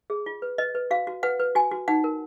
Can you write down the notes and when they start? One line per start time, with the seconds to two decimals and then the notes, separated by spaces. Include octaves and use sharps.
0.10 G#4
0.26 F4
0.42 B4
0.58 B4 D#5
0.75 B4
0.91 F#4 F5
1.07 F#4
1.23 B4 F#5
1.40 B4
1.55 F#4 G#5
1.71 F#4
1.88 D#4 F#5
2.04 A#4